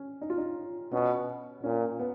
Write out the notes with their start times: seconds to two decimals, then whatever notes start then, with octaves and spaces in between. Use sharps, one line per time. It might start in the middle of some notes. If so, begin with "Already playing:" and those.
Already playing: C#4
0.21 D#4
0.30 F4
0.38 D#4
0.93 B2 C#4
1.63 A#2 C#4
2.00 B3